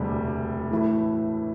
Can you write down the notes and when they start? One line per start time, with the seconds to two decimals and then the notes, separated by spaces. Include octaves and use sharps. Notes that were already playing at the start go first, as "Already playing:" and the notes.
Already playing: E1 D2 C3 G3
0.71 A2 E3 A3